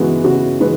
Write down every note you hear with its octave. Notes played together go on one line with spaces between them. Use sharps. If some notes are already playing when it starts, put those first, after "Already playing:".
Already playing: C#3 E3 G#3 B3 F#4
C#3 F#4
E3 G#3 B4